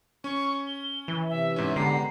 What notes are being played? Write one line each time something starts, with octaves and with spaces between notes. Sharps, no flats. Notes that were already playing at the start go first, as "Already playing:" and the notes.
C#4 C#6
G7
E3
C3 E5
G#2 C#4
D3 G#3 B3 G4 A#5 C7